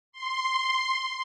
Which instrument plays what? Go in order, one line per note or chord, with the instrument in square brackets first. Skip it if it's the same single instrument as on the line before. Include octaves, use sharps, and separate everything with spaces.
[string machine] C6